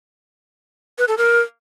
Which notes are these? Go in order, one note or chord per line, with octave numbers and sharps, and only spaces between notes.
B4
A4
A#4